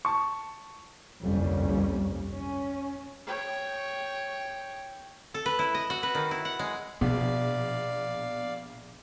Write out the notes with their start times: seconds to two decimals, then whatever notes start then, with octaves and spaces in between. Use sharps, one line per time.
0.05 A5 C#6
1.22 G1 C2 F2 G3 A#3 C#4
2.30 C#4
3.27 C#5 G5
5.34 A4
5.46 B4
5.59 E4
5.74 D#5
5.90 F#4
6.03 B4
6.15 D#3
6.31 E4
6.45 F#5
6.59 G#3
7.01 A#1 B2 B3 D5 F5